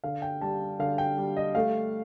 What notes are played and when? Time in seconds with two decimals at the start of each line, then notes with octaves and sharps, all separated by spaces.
0.04 D3 F5
0.22 G5
0.41 G3 A5
0.79 D3 F5
0.98 G5
1.17 G3
1.37 D#5
1.55 A3 F5